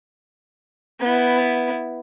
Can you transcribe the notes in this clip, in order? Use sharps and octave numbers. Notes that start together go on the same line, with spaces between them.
B3 E4